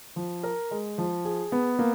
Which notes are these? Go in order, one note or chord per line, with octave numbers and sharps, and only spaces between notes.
F3
A#4
G#3
F3
G#4
B3
A#3